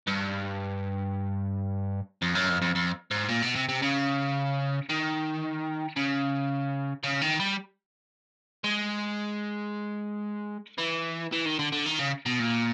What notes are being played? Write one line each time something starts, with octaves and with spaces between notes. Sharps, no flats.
G2
F2
F#2
F2
F2
F2
G#2
A#2
B2
C3
C3
C#3
D#3
C#3
C#3
D#3
G3
G#3
E3
E3
D#3
D3
D3
D#3
C#3
B2
A#2